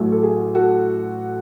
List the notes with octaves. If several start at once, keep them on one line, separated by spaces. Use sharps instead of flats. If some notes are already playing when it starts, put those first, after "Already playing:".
Already playing: A1 A2 F#3 A3
A4
G#4
F#4 A4